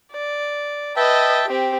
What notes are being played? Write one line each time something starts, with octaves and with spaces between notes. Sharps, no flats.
D5
B4 D#5 E5 G5 A5
C4 G4